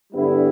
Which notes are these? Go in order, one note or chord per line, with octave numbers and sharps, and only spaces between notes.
G2 D3 G3 B3 E4